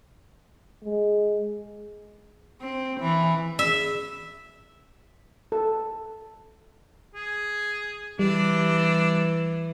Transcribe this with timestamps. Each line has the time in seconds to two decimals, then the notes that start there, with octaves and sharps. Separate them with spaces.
0.83 G#3
2.61 C4
3.00 E3
3.59 E5
5.52 A4
7.15 G#4
8.19 E3 G3 D4